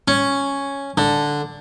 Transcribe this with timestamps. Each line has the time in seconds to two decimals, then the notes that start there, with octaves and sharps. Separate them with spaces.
0.08 C#4
0.97 D3